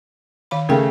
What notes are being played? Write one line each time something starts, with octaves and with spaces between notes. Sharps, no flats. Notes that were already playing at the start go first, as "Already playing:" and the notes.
D#3 F5 B5
C#3 A3 A#4 B4 G5